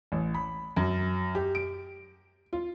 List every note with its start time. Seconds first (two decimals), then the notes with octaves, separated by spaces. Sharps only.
0.12 A1
0.34 B5
0.77 F#2
1.35 G4
1.55 D7
2.53 F4